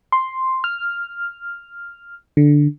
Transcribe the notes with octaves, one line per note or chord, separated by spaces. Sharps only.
C6
F6
D3